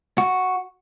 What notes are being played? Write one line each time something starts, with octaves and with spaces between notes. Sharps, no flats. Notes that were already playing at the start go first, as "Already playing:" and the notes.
F#4